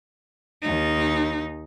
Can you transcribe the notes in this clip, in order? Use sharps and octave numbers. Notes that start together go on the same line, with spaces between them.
D#2 D#4